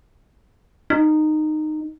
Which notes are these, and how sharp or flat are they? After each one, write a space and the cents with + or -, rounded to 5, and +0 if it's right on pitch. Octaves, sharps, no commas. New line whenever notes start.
D#4 -15